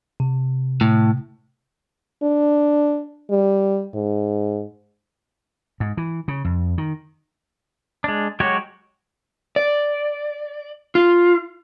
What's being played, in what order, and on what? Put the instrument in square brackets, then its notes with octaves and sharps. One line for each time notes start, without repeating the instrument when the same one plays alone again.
[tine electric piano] C3
[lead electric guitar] A2
[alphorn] D4
G3
G#2
[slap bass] G#2
E3
C#3
F2
D#3
[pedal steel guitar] G#3 D4
F#3 G#3 F#4 G4 C#5
[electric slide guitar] D5
F4